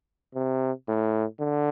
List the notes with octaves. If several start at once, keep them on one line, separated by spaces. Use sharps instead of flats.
C3
A2
D3